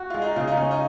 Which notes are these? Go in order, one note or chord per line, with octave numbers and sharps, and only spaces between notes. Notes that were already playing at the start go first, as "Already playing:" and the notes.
Already playing: F#4
G#3 F4
D#4
C#3 F4
D#4
C#4
D#4